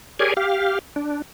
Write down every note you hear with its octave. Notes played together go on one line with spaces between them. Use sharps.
G4 G#4 A#4 C#5 D5 G#5
G4 F5
D4